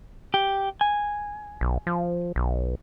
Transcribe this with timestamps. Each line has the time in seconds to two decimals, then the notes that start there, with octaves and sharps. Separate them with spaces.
0.34 G4
0.81 G#5
1.61 B1
1.87 F3
2.36 B1